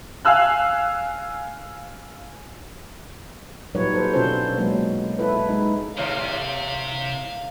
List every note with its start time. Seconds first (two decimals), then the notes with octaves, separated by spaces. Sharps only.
0.25 F5 G#5 E6 F#6
3.75 A#2 F#3 G3 D#4 B4 C#5
3.94 A4 B4 C5
4.13 B2 D3 C#4 F4 A4 C5
4.57 F#3 G#3 A#3 B4
5.19 E4 A4 B4
5.49 G#3 D#4
5.98 D#2 A2 C3 F5